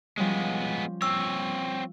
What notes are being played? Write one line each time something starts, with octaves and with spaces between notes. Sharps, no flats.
F3 G3 G#3 B3 C#4
C4 C#5 E6